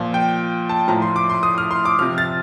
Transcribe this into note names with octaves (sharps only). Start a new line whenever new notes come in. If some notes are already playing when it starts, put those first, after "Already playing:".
Already playing: A#2 F3
G5
A5
A2 F3 A#5
C6
D6
C6
D#6
F6
C6
D6
C3 F3 F6
A6